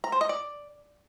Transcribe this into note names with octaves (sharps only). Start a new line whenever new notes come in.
A#5
C5
D#5
D5